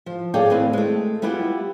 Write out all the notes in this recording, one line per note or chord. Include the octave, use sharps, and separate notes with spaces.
F3
G#4 A4 C#5 D5 F5 G5
A2 D#3 C4 B4
G#3 A3
G3 B3 E4 F4 G4